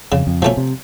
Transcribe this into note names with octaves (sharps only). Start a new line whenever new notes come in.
F2 C#3
F2
B2 F3 A3 C#4
C3